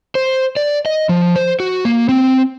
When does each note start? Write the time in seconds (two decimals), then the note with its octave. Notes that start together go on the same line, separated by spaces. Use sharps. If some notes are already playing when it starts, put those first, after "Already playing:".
0.15 C5
0.57 D5
0.86 D#5
1.09 F3
1.36 C5
1.60 F#4
1.85 A#3
2.09 C4